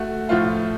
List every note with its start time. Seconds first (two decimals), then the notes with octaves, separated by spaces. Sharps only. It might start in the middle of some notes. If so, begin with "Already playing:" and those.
Already playing: A3 F#4
0.29 A2 F3 A3 F4